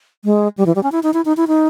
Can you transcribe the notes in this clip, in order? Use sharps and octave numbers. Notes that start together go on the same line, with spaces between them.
G#3
G3
E3
G3
C#4
E4
D#4
E4
D#4
E4
D#4